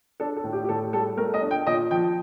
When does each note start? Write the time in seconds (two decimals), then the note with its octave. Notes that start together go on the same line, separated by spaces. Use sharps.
0.20 D4 A4
0.37 A4
0.44 A2
0.53 G4
0.64 G4
0.69 A2 A4
0.93 G3 A4
1.17 A3 A#4
1.34 D#5
1.42 D4
1.51 G5
1.66 A#2 D#5
1.90 F3 G5